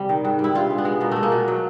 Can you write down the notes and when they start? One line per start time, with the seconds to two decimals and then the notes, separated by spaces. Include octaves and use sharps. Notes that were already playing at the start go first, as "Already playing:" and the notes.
Already playing: C3 G3
0.09 D#3
0.25 G#2
0.39 G3
0.44 E4
0.55 G2 F4
0.70 G#3
0.78 B3
0.85 G#3
1.01 B2 A#3
1.11 G#3 A3
1.23 A#3
1.32 B2
1.48 F#3